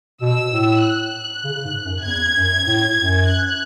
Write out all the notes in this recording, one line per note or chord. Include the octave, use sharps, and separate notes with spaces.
B2 E6
A2
F#6
C#3
G#2
F#2
E2 G#6
F#2
A2
F#2
F#6